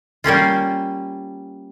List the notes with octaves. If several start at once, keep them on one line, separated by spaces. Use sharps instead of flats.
G3 A#3 C#4 F4